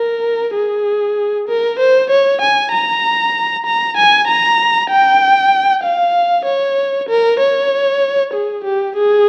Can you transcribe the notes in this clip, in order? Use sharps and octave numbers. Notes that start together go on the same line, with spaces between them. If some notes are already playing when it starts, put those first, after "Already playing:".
Already playing: A#4
G#4
A#4
C5
C#5
G#5
A#5
A#5
G#5
A#5
G5
F5
C#5
A#4
C#5
G#4
G4
G#4